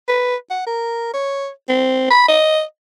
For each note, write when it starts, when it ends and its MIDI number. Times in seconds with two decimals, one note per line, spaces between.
0.08 0.36 71
0.50 0.63 78
0.66 1.10 70
1.14 1.50 73
1.69 2.07 60
2.11 2.28 83
2.28 2.62 75